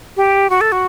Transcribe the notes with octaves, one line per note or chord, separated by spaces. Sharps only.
G4
F#4
A4
F#4